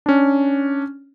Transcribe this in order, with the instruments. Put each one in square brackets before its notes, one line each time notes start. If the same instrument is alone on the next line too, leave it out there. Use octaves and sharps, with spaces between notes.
[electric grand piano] C#4 D4